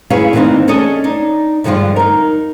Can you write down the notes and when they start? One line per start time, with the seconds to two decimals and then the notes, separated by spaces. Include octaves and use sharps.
0.10 C#4 E4 G#4 B4 C#5 F5
0.33 D#3 E3 A#3 C4 D4 D#4
0.68 C#4 D4 G#4 A4 D#5
1.04 D4 D#4
1.64 G2 D3 F3 G#3 F4
1.96 D#4 A#4